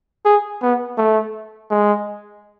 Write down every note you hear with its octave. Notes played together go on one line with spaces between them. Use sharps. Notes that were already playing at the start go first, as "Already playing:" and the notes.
G#4
B3
A3
G#3